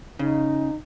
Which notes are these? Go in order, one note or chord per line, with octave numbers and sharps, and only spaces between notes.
C#3 D#4